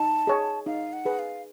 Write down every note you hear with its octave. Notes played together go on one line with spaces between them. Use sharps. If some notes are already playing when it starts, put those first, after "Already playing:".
Already playing: D#4 A5
G#4 C#5
D#4 F5
F#5
G#4 B4
F5